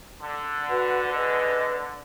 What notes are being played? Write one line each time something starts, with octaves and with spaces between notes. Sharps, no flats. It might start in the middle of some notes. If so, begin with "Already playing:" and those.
D3
F#4 B4 F#5
G#4 B4 D#5